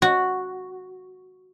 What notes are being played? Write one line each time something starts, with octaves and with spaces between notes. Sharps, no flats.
F#4